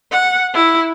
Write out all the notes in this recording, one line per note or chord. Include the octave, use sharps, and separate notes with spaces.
F#5
E4